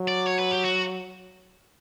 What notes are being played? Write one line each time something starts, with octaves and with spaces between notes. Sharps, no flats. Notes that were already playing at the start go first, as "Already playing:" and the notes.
Already playing: F#3
D5
C#5
B4
G4
F#4